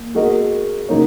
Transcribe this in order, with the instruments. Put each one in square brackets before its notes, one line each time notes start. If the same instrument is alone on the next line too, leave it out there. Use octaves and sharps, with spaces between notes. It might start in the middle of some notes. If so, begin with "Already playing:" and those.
Already playing: [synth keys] A#3
[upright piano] G#3 F#4 A#4 D#5
[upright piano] C#3 F#3 D#4 A#4 C#5 [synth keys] A#3